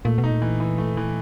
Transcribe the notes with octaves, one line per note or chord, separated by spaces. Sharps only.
A#2 A3
B2
D#4
A#2
E3
E3
A3
E3